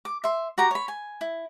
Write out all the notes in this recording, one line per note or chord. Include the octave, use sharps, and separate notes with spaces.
D6
E5 C6
F#4 G4 A#5
C#5 B5
G#5
E4